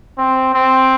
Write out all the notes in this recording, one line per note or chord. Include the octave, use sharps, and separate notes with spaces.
C4
C4